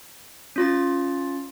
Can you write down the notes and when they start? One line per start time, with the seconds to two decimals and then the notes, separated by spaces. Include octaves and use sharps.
0.56 C#4 F4 A6